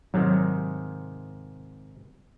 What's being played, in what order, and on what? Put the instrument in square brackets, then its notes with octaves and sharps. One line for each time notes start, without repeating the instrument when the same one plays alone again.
[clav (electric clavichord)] G#2 C3 D#3 [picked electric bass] F#3